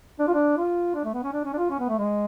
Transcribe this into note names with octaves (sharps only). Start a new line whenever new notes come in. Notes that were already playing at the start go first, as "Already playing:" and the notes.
D4
F4
D4
F4
D4
A3
B3
C#4
D4
C#4
D4
F4
C#4
B3
A3
G#3